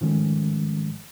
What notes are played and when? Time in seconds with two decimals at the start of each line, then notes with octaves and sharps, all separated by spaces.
0.01 G#2 D#3 F3 G#3 A3 C#4